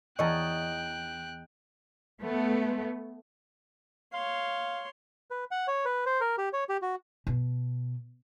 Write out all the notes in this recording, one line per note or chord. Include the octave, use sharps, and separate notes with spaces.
E2 C#5 D#5 G5 A5 A#5 F#6
A3 B3
C#5 F5 C6
B4
F#5
C#5
B4
C5
A#4
G4
C#5
G4
F#4
B2